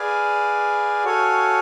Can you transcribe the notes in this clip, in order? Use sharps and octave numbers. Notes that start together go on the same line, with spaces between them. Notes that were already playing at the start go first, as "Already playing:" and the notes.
Already playing: G#4 B4 D5 F5 G#5
F#4 A4 C#5 F5 G#5